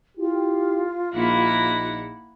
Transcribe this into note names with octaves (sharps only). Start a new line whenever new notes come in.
E4 F4 G4
A#1 A#3 D#4 E4 F#5